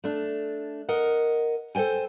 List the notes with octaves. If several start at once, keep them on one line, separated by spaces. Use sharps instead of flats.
A3 D4
A#4 D#5 F#5
A4 C5 C#5 G5 G#5